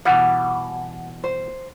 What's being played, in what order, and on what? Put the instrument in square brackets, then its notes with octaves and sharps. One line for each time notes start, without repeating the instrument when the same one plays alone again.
[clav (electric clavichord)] B2 E3 G3 [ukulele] F#5
[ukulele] C5